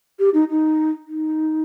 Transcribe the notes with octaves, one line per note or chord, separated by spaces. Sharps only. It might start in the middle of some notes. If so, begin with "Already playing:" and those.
G4
D#4
D#4
D#4